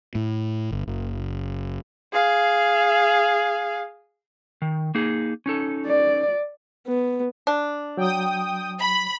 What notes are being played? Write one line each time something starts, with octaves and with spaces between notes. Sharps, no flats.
A2
G1
F#1
G#4 F5
D#3
A#3 D#4 G#4
C#4 D#4 A4
D5
B3
D4
F#3 G5 D#6
B5